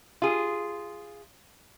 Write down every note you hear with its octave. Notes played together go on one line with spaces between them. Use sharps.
F4 G#4